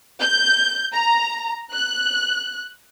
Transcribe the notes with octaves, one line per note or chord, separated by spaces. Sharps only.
G6
A#5
F#6